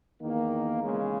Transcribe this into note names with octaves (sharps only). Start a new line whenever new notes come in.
E2 D#3 A#3
E2 C#3 G#3